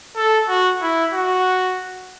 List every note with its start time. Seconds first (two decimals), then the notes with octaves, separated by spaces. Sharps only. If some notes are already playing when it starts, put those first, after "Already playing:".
0.16 A4
0.48 F#4
0.81 E4
1.13 F#4